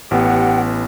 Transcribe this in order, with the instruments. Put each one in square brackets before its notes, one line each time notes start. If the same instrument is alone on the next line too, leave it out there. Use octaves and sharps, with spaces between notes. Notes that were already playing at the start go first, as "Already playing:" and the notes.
[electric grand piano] A1 B3 [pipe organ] G4 G5 [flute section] F#5